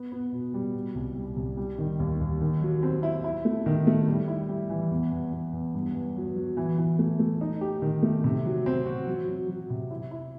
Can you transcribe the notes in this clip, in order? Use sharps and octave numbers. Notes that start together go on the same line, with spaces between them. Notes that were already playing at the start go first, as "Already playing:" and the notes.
Already playing: B3
B3
B2
G3
B2
C2
G3
C2
G3
D#3
D#2
D#2
D#3
F#3
C4
E4
E4
A3
D#3
A3
G3
E4
G3
E3
E2
E2
E2
E2
G2
G2
F#3
F#3
E3
E3
A3
A3
D#4
G4
D#3
A3
C3
F#3
C4
F#4
F#3
F#3
F#3
C3
E4
E4